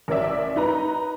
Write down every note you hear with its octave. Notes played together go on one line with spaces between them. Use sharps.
A1 A#4 C#5 D5 E5
D#4 B4 A#5